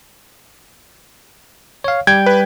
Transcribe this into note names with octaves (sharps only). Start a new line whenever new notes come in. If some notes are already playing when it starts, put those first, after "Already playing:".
C#5 F5
G3 G5 G6 G#6
B4